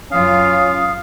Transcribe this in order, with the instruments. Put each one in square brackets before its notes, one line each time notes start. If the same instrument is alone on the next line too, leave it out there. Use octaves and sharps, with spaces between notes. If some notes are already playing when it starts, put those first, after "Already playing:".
[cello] F#2 F4 [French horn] C#4 [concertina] F5 [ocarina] D#6